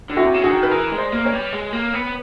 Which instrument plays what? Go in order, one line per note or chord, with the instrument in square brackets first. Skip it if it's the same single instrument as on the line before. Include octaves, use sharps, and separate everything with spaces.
[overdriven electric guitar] D3
[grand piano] E4 F#4
[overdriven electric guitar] C3
C#3
[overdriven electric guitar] D3 [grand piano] F#4 G#4
[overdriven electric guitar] D#3
[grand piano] B4
[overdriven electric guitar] E3 [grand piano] G#4 A#4
[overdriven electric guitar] G#3
[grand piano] C5 D5
[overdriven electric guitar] A#3
[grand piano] B4 C#5
[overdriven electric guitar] G3
G#3
A#3
B3